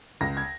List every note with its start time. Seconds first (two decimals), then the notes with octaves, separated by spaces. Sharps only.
0.21 C#2 A#6
0.37 G#6